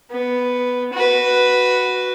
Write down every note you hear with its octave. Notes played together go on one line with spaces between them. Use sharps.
B3
F#4 B4